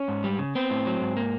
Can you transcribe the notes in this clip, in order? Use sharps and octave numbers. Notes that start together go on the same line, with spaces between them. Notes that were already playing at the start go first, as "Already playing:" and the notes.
Already playing: C#4
G#2
G3
C#3
B3 C4
A2
F#3
G#2
A#3